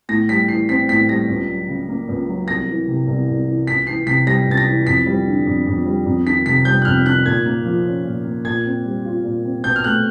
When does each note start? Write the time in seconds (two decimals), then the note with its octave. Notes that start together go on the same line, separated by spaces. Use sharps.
0.09 A2 A#6
0.29 G3 B6
0.48 E3 C7
0.69 C4 B6
0.89 A2 B6
1.09 G3 A#6
1.29 C#2
1.48 F#3
1.68 C#3
1.89 A#3
2.09 C#2
2.29 F#3
2.48 C2 A#6
2.67 E3
2.88 C3
3.07 C2
3.28 C2
3.48 E3
3.67 C#2 B6
3.87 E3 C7
4.07 C3 B6
4.27 G3 A#6
4.46 C#2 A6
4.57 A#6
4.67 E3
4.87 F2 B6
5.06 G3
5.27 D3
5.46 F2
5.67 F2
5.86 G3
6.06 F2
6.26 D#3 B6
6.46 C3 B6
6.65 G3 G6
6.82 F#6
6.85 F2 F6
7.06 D#3 F#6
7.26 A#2 G#6
7.45 A#3
7.65 F3
7.86 C#4
8.05 A#2
8.25 A#3
8.45 A#2 G#6
8.65 C4
8.85 G3
9.05 F4
9.24 A#2
9.45 C4
9.64 B2 G6
9.76 F6
9.84 A3 F#6